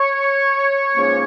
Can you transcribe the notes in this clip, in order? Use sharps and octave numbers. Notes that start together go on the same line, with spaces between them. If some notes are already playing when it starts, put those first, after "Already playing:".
Already playing: C#5
G#2 F3 A#3 C#4